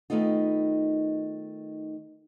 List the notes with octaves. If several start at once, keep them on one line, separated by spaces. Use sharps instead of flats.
D#3 A3 B3 D#4 F4